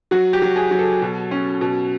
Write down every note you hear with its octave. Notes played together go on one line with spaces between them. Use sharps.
F#3 F#4
G4
F#3
G#4
F#3
A4
B2
C#4
B2